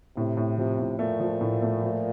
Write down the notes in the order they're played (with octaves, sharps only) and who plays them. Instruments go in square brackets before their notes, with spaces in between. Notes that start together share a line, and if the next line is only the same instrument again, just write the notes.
[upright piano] A2 [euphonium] C3
[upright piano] A2
[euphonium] C3 [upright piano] F3
[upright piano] A2
[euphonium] A#2 [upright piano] A3
[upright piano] F3
A2
A3
F3